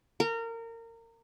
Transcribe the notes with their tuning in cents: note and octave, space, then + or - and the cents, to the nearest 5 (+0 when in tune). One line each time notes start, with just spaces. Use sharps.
A#4 -25